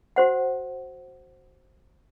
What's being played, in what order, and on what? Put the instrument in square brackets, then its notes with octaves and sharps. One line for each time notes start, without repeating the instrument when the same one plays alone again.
[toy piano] F#4 C5 F#5